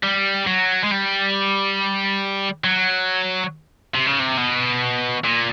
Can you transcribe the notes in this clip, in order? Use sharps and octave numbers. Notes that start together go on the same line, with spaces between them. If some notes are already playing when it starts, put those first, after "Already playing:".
G3
F#3
G#3
G3
F#3
C3
C#3
C3
B2
A#2